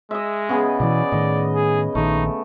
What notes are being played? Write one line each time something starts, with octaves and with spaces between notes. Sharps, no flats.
G#3 D#5 E5
C#3 B3 G#4
B2 D3 E3 D5
A2 D#3 D#5
G#4
A#1 D#3 A3 D#4